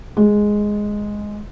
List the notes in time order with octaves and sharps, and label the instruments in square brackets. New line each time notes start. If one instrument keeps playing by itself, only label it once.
[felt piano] G#3